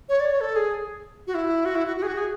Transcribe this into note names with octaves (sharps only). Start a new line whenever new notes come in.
C#5
D5
C#5
A4
G#4
F#4
E4
F#4
E4
F#4
F#4
G#4
F#4
G#4